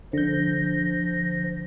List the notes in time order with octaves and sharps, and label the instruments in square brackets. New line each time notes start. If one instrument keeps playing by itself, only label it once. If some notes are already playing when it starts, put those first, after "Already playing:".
[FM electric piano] D3 G6 [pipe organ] F3 A#6